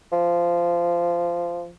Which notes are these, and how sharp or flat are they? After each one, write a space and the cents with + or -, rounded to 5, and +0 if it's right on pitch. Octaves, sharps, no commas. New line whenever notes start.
F3 -15